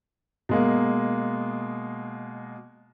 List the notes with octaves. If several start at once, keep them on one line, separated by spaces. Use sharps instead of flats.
B2 G#3 A#3